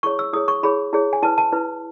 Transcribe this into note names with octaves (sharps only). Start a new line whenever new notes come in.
E4 G#4 C#5 C#6
E6
E4 G#4 C#5 D#6
C#6
E4 G#4 C#5 B5
E4 G#4 C#5
G#5
E4 B4 A5
A5
E4 B4